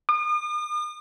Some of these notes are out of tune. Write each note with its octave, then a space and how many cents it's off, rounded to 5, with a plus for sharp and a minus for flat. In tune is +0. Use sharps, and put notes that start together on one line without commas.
D#6 -45